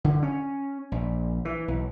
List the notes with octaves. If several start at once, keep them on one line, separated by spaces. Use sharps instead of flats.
D3
C#4
A#1
E3
B1